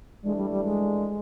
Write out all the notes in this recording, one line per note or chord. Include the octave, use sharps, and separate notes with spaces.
G2 E3 G#3 A3 D4
G3
G3
G#3